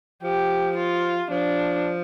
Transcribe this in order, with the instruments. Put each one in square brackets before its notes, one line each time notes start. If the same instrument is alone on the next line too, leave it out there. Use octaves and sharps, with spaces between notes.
[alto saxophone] F3 [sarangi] G4
[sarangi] F4
[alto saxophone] F3 [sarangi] D4